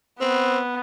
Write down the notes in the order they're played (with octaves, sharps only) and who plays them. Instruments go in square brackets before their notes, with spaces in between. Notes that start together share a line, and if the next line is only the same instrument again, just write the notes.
[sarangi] B3 [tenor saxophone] C4